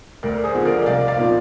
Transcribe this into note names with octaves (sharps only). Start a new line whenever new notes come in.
D2 A#4 D5
G#4 C5
D3 F3
A#4 D5
D#5
C2 D5 F5
D5 F5
A#2 F3